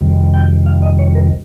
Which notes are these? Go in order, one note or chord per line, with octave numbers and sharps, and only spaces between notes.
F2 C3 D#3 G3
G5
F5
D#5
C#5
A#4